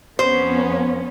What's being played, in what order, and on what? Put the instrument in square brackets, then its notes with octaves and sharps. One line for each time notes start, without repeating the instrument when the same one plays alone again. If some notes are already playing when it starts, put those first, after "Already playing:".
[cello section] F2 B3 C#4 [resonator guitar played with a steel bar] C5